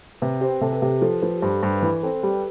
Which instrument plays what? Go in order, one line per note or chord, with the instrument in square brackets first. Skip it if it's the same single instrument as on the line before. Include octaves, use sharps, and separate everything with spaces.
[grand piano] C3 [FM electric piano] B4
[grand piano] C4 [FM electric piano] G4
[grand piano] C3 [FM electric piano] A4
[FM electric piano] A4
[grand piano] C3 [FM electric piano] G4
[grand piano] F3 [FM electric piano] A4
[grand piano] F3 [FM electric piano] B4
[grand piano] G2 [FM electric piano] C5
[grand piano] G2 [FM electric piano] C5
[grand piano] E3 [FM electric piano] B4
[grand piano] C4 [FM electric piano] A4
[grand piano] G3 [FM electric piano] G4